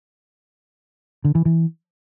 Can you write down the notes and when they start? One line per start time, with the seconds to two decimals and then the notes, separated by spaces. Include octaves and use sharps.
1.25 D3
1.35 E3
1.45 E3